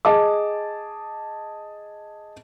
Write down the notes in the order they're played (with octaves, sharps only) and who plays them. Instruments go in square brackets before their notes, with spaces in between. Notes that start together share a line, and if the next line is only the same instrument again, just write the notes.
[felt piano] G#4 D#5 A5 D6